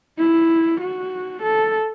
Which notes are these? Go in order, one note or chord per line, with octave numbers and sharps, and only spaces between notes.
E4
F#4
A4